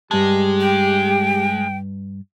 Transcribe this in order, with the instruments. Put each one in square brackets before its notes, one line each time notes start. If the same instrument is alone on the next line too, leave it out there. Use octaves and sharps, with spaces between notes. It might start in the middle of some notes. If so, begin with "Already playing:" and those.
[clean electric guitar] G2 A5 [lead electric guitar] G#3 [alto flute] G4
[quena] G5